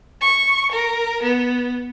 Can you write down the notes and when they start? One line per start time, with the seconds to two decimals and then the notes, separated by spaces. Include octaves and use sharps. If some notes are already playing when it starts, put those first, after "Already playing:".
0.22 C#6
0.71 A#4
1.23 B3